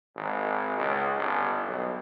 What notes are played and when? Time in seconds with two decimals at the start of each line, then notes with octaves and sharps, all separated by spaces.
0.16 G#1
0.78 C#2
1.17 G1
1.67 B1